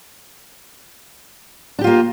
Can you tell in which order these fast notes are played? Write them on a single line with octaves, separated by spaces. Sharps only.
D4 G4 F4 A#3